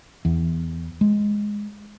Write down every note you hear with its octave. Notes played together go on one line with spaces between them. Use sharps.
E2
G#3